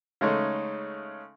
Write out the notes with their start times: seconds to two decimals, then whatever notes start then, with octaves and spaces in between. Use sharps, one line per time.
0.21 C#3 G#3 A3 C#4 D#4